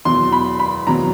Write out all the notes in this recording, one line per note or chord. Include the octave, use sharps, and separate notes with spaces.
E2 B2 F#3 C6
B5
B5
E2 B2 F#3 A#5